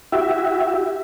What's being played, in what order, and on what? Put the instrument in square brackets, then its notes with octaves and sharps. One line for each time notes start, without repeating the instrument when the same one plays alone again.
[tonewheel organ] E4 F#4 G4 E5